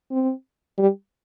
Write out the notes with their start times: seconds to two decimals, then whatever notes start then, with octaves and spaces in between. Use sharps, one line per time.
0.11 C4
0.78 G3